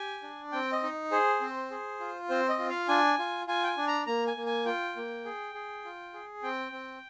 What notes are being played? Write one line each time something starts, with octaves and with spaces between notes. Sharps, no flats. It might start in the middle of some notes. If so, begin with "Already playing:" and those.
Already playing: G4 G#5
D4
C4 G5
D#5
D#4
G#4 C5
C4
G#4
F4
C4 C5
D#5
F4
F5
D4 G#5
F4
F4 G#5
G5
G#5
D4
A#5
A#3 A#5
G#5
A#3
G#5
F4 G5
A#3
G#4
G#4
F4
G#4
C4 G5
C4